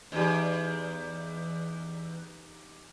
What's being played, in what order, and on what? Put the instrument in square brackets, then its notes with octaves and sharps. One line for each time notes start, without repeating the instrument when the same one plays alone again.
[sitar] E2 [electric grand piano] D#4 G4